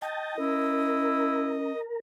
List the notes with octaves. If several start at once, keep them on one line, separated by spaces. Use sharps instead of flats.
D#5 G5 A5
C#4 E4 A#4